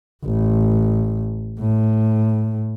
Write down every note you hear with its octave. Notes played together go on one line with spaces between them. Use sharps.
A1
A2